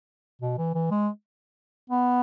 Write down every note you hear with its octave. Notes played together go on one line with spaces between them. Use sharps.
B2
E3
E3
G#3
B3